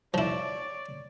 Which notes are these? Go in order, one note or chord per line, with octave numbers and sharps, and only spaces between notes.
F3 E4 C#5 D5